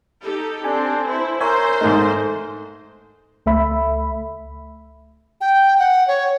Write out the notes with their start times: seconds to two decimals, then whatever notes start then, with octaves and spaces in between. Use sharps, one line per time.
0.23 D#4 G4 A4
0.64 C4 D4 G#5
1.08 E4 C5
1.40 A#4 C5 C#5 E5 G#5
1.81 G#2 A3 D#4
3.46 C#2 A3 E5 B5
5.41 G5
5.79 F#5
6.08 C#5